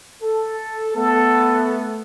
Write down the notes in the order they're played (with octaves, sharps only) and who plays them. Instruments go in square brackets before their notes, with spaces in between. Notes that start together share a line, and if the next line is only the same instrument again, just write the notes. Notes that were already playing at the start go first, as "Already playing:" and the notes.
[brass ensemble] A4
[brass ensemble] A3 B3 [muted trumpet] A4